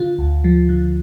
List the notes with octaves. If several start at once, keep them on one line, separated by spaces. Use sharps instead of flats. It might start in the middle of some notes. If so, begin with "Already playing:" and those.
Already playing: D3 F4
D2
F3
D3